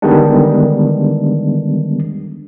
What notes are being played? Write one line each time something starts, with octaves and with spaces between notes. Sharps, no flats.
D3 D#3 G3 G#3 B3 D4